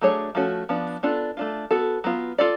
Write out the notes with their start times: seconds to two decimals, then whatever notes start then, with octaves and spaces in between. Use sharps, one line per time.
0.01 F#3 A3 D4 G#4 C#5
0.35 F3 A3 C#4 F#4
0.69 F3 B3 D4
1.03 B3 D4 F4 A4
1.37 A3 D4 F4
1.71 B3 F#4 A4
2.04 F#3 B3 F4
2.38 F4 A4 D5